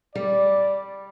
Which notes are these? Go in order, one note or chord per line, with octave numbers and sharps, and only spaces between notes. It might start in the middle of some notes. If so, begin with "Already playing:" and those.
G3 D5